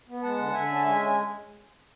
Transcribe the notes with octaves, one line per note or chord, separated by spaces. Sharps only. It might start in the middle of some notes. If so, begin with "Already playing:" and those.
B3
G#3 F#5 A5
D3
D3 E5 G#5
C#4
A5
G#3 E5 G#5